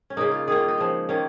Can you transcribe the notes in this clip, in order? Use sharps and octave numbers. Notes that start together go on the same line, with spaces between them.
C#4
C#3 A#3 D#4
F4
D#3 A#3 G#4
F4
D#4
C#3 F3 G#3
D#3 A#3 C#4